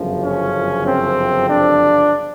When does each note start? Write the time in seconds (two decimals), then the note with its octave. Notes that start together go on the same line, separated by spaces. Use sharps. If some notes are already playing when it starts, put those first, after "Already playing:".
Already playing: G1 F#2 C#3 F3
0.24 C#4
0.87 C4
1.49 D4